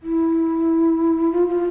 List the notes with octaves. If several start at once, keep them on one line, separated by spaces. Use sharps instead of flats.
E4
F4
F4